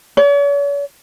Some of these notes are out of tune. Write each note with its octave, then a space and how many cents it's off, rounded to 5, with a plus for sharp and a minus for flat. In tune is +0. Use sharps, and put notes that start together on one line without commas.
C#5 +45